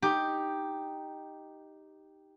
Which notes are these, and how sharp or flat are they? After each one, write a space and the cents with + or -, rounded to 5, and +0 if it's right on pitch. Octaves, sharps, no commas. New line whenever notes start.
D#4 +0 G4 +0